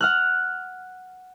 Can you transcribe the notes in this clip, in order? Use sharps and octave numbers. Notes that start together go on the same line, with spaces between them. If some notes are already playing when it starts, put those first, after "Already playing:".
F#5 F6 F#6